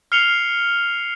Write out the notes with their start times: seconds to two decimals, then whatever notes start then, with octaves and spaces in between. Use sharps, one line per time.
0.12 F6 C7 C#7 F7 G7